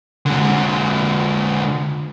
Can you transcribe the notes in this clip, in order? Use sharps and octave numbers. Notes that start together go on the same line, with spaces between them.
D3 G#3